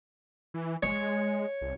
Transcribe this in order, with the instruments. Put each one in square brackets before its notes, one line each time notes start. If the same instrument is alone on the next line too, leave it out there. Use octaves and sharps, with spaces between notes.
[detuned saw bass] E3
[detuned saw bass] G#3 [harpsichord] C#5
[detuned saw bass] C2